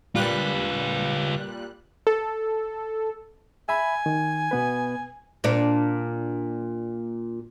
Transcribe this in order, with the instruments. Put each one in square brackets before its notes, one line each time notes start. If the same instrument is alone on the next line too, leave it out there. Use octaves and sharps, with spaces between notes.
[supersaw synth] A#2 G3 F#6 [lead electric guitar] F4 B4
[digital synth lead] A4
[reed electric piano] E5 B5 [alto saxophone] G#5
[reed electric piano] D#3
B2 B3 B4
[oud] A#2 D4